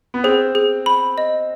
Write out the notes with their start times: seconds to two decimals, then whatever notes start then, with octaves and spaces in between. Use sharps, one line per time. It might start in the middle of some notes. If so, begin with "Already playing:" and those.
0.14 B3
0.24 C4 G#4
0.55 G#4
0.86 B5
1.18 D#5